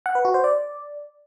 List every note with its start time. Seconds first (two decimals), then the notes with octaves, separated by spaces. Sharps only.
0.06 F#5
0.15 B4
0.25 F#4
0.34 C5
0.44 D5